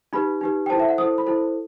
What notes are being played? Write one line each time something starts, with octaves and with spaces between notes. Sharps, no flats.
D#4 G4 B4 B5
D#4 G4 B4
G5
E4 A4 C5 A5
E5
F#5
E4 A4 C5 D#6
B5
E4 A4 C5